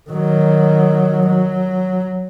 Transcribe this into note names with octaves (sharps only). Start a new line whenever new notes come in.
D#3 F#3
F#3